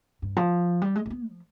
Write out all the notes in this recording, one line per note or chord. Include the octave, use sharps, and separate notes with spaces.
G2
F3
G3
G#3
G#3
B3
F3